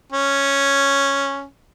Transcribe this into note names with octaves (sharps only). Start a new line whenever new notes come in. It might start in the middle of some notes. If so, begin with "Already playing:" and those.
C#4